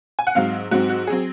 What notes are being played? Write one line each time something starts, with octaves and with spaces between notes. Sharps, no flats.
G#5
F#5
G#2 F#3 C4 F5
G#2 F#3 C4 F#4
F#4
F#3 C4 G#4